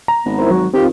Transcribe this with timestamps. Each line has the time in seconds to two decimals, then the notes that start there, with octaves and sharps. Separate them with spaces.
0.08 A#5
0.25 G#1 B3
0.39 E4 A#4 C5
0.51 F#3 F#4
0.74 D#3 C4 F4 G4